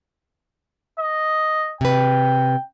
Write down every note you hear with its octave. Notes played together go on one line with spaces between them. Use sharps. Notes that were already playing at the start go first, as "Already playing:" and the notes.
D#5
C3 B4 G5